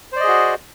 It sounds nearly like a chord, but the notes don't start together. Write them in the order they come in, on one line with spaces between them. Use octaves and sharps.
C5 D5 D#5 G#4 F#4